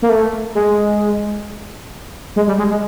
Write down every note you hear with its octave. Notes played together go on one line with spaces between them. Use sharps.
A#3
A3
G#3
G#3
G3
G#3
G#3